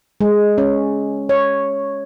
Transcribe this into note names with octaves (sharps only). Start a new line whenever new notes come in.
G#3
C#4
C#5